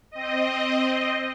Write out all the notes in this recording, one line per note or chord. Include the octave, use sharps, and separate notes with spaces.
C4 D#5